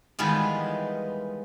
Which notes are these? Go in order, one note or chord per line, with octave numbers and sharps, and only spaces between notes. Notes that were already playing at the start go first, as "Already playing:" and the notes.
D#3 E3 G3 G#3 B3 F4